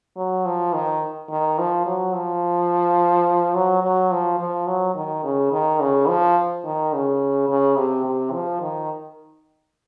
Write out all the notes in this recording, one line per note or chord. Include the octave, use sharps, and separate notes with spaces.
F#3
F3
D#3
D#3
F3
F#3
F3
F#3
F#3
F3
F3
F#3
D#3
C#3
D#3
C#3
F3
D#3
C#3
C#3
C3
C3
F3
D#3